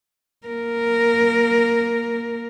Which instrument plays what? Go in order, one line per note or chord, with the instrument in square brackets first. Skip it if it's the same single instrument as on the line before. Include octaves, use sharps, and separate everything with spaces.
[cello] A#3 A#4